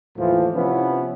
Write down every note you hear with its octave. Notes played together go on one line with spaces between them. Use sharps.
D#2 A2 E3 F3
C3 F3 B3 C#4 E4 B4